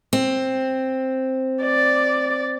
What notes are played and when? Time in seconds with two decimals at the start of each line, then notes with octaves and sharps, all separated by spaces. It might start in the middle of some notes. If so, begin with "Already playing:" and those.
0.13 C4
1.63 D5